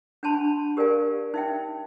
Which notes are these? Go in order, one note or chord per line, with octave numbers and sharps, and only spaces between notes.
D4 F#5 G#5 A5 B5 C6
G4 A#4 D5 F5 G#5
D#4 E5 G5